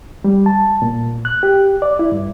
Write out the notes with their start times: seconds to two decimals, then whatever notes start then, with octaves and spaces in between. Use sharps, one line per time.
0.24 G3
0.46 A5
0.82 A#2
1.25 F#6
1.43 G4
1.82 D5
1.99 E4
2.12 G2